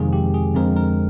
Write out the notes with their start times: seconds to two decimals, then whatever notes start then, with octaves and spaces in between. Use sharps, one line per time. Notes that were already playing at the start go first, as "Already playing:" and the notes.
Already playing: F2 C3 D#3 G#3 C4 G#4
0.13 G4
0.34 G#4
0.55 F2 D3 G#3 C4 A#4
0.77 A#4